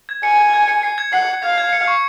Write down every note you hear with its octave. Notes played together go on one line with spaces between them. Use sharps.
G#6
G#5 C#7
G#6
G#6
C#7
C7
G#6
F#5 C7
G#6
F5 G#6
G#6
C#7
C#6